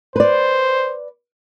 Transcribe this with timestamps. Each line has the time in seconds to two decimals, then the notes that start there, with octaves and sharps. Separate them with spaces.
0.16 B4 C5 D5